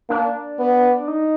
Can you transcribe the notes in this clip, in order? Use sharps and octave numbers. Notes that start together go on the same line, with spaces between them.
A#3 D4
B3
D#4